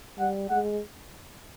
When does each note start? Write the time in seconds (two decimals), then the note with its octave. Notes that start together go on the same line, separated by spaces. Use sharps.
0.18 G3 F#5
0.50 G#3 F#5